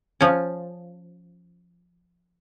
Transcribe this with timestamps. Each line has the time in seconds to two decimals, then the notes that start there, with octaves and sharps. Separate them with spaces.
0.21 F3 C#4